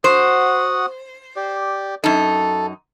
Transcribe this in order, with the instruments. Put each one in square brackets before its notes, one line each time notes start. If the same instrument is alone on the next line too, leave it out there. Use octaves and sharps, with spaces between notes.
[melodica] F#4 F#5 D#6 [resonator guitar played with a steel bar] C5
[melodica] G4 D5
[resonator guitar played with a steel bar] F#2 D#4 [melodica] A4